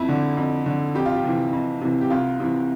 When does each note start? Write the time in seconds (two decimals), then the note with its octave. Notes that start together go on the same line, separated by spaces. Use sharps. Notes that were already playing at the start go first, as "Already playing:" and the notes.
Already playing: F2 E4
0.09 D3
0.37 F2
0.66 D3
0.95 F2 G4
1.05 F4
1.16 G4
1.24 C3 E3
1.53 F2
1.81 C3 E3
2.01 G4
2.10 C2 F4
2.40 C3 E3